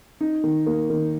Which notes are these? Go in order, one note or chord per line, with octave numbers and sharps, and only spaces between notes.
D#4
D#3
A#3
D#3